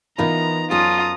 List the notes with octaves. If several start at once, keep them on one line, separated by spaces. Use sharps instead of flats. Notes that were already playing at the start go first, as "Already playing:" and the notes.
E3 B3 D#4 F4 A#4 A#5 B5
F#2 C#4 F4 A4 D5 A#5 D#6